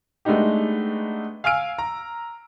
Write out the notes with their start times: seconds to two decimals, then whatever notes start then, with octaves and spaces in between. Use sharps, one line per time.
0.25 G#3 A3 B3 D4 D#4 G4
1.44 F5 G#5 E6 F6 D7
1.78 A#5